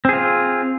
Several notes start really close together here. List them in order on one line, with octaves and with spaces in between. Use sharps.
C4 G#4 F4